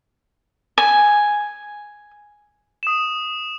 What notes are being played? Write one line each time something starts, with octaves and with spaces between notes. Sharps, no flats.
G#5
D#6 E7